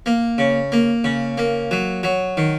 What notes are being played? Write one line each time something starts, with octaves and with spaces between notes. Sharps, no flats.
A#3
C#3
A#3
C#3
A#3
F#3
F#3
D#3